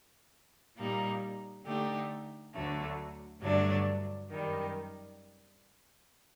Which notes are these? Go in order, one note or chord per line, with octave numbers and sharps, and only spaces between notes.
A#2 G3 A#3 D#4
D3 A3 D#4 G4
D2 D3 F#3 A3
G2 D3 F#3 A3 D4
F#2 D#3 G3